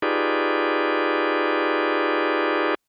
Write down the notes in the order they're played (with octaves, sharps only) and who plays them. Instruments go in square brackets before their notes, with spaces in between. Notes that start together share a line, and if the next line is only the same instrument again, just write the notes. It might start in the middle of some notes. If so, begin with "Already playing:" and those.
[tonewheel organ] D#4 F4 G4 G#4 B4 D5